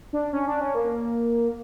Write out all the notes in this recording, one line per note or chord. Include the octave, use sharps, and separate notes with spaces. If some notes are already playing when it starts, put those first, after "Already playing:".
D4
C#4
D4
C#4
A#3